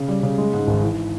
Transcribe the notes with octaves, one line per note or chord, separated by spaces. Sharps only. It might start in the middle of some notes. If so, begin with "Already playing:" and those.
Already playing: C#3
G3
C#3
G#3
G#2
G#1
E3